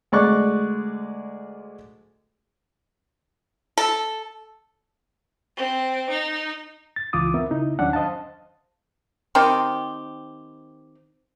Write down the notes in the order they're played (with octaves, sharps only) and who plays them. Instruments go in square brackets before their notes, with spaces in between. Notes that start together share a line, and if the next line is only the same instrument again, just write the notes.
[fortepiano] D2 G#3 D5 C#6 F#6
[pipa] A4
[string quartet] C4
D#4
[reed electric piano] A6
C#2 E3 F4 D6 D#6
B3 C4 A#4 E5
C#3 D#4 E4
D#2 D#3 F#3 C#4 D4 F#5
C5 D#5 F5 A5
[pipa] D#3 C4 D#4 G4